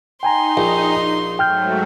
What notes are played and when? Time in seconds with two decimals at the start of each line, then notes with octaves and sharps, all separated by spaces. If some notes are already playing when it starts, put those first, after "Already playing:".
0.23 D#4 G5 G#5 A#5 C6
0.57 A#1
1.39 G#2 F#3 A3 G5 F6 G6